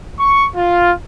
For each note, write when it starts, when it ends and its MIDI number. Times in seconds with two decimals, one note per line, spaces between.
0.19 0.47 85
0.55 0.91 65